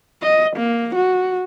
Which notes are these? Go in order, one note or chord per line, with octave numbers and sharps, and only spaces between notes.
D#5
A#3
F#4